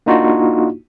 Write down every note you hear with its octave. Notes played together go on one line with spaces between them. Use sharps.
A#3 D4 D#4 F4 F#4